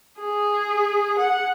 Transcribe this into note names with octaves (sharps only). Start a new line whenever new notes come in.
G#4
F#5